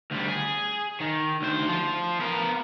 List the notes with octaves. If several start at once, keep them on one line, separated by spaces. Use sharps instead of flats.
D2 G3
G#4
D#3
D2 C5
F3 F4
B3 A#4